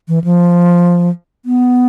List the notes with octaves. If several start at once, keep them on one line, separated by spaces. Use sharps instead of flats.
E3
F3
B3